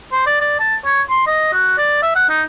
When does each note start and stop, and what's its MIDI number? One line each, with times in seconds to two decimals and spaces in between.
0.12 0.26 72
0.26 0.39 74
0.40 0.58 74
0.59 0.76 81
0.85 1.02 73
1.10 1.24 84
1.27 1.52 75
1.53 1.74 66
1.78 1.98 74
2.02 2.12 76
2.15 2.29 78
2.29 2.42 63